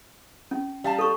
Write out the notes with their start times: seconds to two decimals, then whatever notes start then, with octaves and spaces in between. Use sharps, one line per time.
0.51 C#4
0.84 G3 F5 A5
0.99 A4 C#6